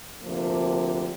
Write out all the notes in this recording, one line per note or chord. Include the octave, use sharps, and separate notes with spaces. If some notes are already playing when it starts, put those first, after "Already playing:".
D2 C3 F3 A#3